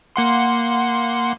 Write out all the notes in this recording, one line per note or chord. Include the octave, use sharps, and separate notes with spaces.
A#3 F#5 C6